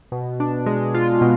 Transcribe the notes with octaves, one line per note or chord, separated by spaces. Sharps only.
B2
D4
G#3
F4
B2